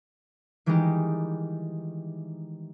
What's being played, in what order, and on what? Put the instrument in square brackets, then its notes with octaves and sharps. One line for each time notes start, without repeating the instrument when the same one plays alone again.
[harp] D#3 E3 G3 G#3 D#4 G4